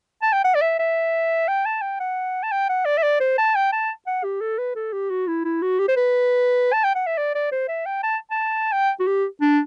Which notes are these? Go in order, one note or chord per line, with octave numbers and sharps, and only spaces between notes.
A5
G5
F#5
D5
E5
E5
G5
A5
G5
F#5
A5
G5
F#5
D5
E5
D5
C5
A5
G5
A5
F#5
G4
A4
B4
A4
G4
F#4
E4
E4
F#4
G4
C5
B4
A5
G5
F#5
E5
D5
D5
C5
E5
G5
A5
A5
G5
F#4
G4
D4